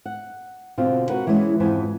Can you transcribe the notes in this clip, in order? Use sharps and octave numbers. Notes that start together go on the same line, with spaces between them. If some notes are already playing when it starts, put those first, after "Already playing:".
F#5
B2 D3 C4 F4
F#4 A#4 B4 F#5
E3 G#3 B3 C#4
F2 G#2 E3 B3 C5 G#5